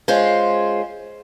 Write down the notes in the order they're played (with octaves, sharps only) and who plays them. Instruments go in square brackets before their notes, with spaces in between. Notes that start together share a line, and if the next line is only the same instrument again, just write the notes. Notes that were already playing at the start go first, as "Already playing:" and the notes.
[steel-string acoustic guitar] G#3 C#4 F4 C5